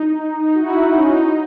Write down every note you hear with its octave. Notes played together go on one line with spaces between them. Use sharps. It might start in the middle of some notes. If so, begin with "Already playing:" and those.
Already playing: D#4
D#4
F#4
E4
D#4
C#4
D#4